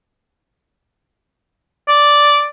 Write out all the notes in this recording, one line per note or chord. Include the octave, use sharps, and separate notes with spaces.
D5